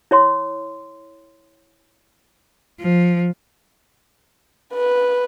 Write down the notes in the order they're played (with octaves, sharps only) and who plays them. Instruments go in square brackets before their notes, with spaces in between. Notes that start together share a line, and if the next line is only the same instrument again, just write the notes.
[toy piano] E4 C#5 C6
[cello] F3
[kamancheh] B4